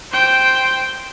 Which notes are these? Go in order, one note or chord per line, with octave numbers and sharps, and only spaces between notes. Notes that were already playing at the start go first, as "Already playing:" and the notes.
C5 G5